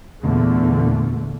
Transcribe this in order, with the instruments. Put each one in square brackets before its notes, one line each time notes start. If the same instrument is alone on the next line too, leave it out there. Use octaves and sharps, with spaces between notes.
[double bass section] E2 A#2 D3 A3